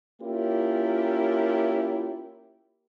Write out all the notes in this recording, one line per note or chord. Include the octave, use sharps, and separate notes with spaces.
A#3 C#4 E4 F4 G4 A#4